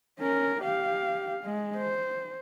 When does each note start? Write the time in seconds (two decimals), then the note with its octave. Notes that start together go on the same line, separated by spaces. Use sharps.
0.19 C#4 A#4
0.62 G4 F5
1.44 G#3
1.77 C5